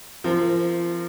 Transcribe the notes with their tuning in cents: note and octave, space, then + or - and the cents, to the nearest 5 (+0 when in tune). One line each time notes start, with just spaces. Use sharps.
F3 -30 C4 +0 A#4 -30